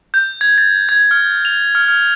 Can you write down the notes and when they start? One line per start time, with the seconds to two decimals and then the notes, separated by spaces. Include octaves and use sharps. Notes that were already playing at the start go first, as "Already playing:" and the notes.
0.14 G6
0.41 G#6
0.58 A6
0.89 G#6
1.11 F6
1.45 F7
1.75 F6
1.88 F6